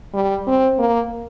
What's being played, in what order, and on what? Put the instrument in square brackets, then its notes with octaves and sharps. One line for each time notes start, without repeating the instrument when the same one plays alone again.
[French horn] G3
C4
A#3